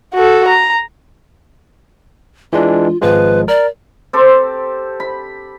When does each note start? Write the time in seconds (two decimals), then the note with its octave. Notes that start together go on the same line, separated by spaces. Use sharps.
0.14 F#4 A4
0.48 A#5
2.53 E3 G#3 D4 F4
3.02 G#1 F3 G#3 B4
3.48 A#4 D5
4.13 C4 G4 A4 C5
5.00 B5